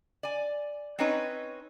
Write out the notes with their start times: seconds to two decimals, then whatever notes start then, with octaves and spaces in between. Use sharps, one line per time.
0.23 D5 G#5
0.99 C4 C#4 D#4 B4 C#5